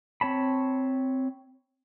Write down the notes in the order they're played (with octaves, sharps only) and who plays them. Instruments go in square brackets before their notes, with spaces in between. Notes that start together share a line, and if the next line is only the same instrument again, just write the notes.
[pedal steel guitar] C4 C#5 A5 B5